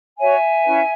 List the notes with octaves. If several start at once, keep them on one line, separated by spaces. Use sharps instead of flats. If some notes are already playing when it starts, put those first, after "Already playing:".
F#4 C#5 E5 G#5
C#4 E4 B4